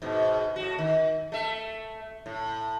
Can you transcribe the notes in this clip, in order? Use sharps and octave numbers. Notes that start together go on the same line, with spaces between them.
G#2 B2
A2 F#4
D#3
A3 E5
A2